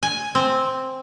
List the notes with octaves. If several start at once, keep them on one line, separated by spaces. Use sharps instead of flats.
G#5
C4